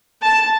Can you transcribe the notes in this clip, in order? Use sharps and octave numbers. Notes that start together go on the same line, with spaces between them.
A5